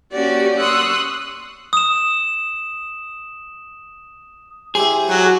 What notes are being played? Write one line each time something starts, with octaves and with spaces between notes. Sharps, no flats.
A#3 C#4 F#4 G4 D5
C6 C#6 D#6 E6 F#6
D#6 E7
E4 G4 G#4 C5
F#3 F#4